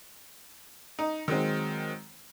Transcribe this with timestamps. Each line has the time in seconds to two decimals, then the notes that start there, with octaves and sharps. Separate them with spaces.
0.99 D#4
1.28 D#3 F#3 G#3 C4